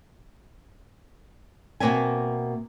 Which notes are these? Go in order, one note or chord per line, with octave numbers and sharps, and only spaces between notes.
B2 F#3 A#3 C4 E5 G#5